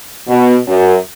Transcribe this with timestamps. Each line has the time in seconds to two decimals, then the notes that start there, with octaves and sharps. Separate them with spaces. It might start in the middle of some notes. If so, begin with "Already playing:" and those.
0.28 B2
0.68 F#2